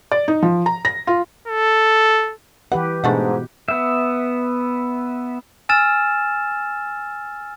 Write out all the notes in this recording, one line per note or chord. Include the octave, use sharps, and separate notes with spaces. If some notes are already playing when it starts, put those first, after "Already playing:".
D5
D#4
F3
A#5
A#6
F4
A4
E3 G4 B4 F#5
G#2 B2 A3 D4 F#5
B3 E5
G#5 E6 F6 A6 E7